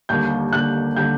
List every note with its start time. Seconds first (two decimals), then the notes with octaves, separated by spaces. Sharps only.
0.09 D#2 D3 G3 A#3 G6
0.53 D#2 D3 G3 A#3 F#6
0.95 D3 G3 A#3 G6